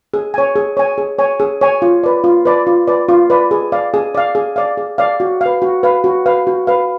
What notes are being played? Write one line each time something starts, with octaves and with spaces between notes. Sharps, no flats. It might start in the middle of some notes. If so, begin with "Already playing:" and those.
G#4
C#5 G#5
G#4
C#5 G#5
G#4
C#5 G#5
G#4
C#5 G#5
F4
B4 D5
F4
B4 D5
F4
B4 D5
F4
B4 D5
G#4
D5 F5
G#4
D5 F5
G#4
D5 F5
G#4
D5 F5
F#4
B4 F5
F#4
B4 F5
F#4
B4 F5
F#4
B4 F5